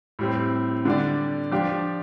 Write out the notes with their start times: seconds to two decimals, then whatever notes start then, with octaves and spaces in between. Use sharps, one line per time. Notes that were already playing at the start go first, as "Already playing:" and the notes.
0.19 A2 G3 C4
0.85 D3 G3 D4 G4 D5
1.52 F3 D4 G4 D5